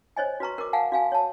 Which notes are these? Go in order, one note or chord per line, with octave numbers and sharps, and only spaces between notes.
C5 C#5 D#5 G#5
F#4 B4 A#5 C#6
A#4 D6
F5 F#5 G#5 A5
F#4 F5 G#5
C#5 A5